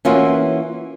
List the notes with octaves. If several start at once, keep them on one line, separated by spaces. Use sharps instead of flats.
E3 A#3 C#4 F4 F#4